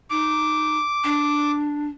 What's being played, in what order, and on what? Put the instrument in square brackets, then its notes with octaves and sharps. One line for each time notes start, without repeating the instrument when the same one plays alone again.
[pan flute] D#4 [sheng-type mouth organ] D6
[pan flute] D4